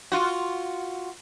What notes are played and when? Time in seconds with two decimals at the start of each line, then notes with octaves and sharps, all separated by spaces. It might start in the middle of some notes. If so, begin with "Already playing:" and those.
0.12 F4 F#4